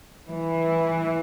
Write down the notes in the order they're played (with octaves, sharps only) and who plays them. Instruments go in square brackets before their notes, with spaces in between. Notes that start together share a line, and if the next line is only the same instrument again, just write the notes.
[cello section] E3